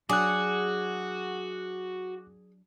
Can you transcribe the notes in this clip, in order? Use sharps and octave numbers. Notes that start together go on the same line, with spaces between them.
F#3 D4 F#4 G#4 D6 F#6